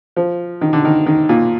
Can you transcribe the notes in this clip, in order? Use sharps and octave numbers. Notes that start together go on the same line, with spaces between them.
F3
D#3
D3
D#3
D#3
A#2